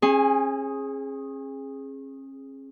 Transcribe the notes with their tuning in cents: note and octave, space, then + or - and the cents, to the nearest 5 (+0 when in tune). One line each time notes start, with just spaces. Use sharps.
C#4 -40 G#4 +0